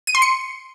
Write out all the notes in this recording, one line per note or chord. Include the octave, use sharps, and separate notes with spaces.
D#7
C6
C#7